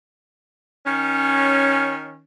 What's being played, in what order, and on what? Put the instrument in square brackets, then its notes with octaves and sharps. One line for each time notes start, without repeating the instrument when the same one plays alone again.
[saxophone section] D#3 C#4